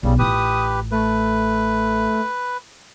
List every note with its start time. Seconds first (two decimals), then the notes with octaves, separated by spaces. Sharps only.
0.03 B1 C#3 G3
0.19 A1 F4 G4 B4 D#6
0.91 A3 B4